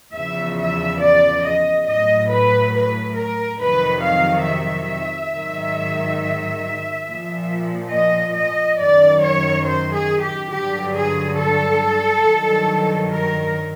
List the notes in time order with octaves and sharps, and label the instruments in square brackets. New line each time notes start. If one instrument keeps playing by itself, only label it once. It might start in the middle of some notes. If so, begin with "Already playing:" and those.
[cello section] E2 C#3 F3 E5
E5
D5
D#5
A2 F#3 D#5
B4
B4
A#4
F2 C3 D#3 F#3 B4
F5
E5
G#2 D#3 F#3
A#2 F3
D#5
D#5
F#2 D#3 F#3 D5
C#5
C5
G#4
G4
G2 D3 F#3 G4
G#4
A4
G2 D#3 F#3
A#4